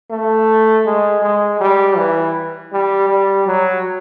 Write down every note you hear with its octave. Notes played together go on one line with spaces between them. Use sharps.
A3
G#3
G#3
G3
E3
G3
G3
F#3